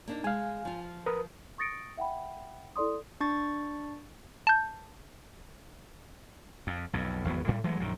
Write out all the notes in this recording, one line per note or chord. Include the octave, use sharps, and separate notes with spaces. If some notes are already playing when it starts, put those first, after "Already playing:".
A#3 D4 D#4
G#3 F5 G#5
F3 F4
A#4 B4 D#6
C#6 D#6 A6 A#6 C#7 D7
E5 F#5 G5 B5
E4 A4 D5 C6 D#6
D4 C#6 A6
A5 G6
F2
B1 F2
G#1 E2 F#3 B3
A2 G3
E3 F#3 G#3 A3
A#1 F#2 D#3